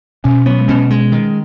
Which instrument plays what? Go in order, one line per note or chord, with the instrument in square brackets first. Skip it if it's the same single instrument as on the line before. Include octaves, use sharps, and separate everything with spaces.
[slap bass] B2 [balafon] C#4
[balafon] F#3 [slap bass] B3
[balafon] G#3
[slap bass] B2 [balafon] C#4
[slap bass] G#3
D#3